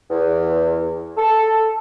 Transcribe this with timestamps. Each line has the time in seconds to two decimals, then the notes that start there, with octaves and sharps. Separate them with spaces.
0.10 E2
1.17 A4